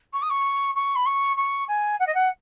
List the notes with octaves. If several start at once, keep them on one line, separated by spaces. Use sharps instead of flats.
C#6
D#6
C#6
C#6
B5
C#6
C#6
G#5
F#5
D#5
F#5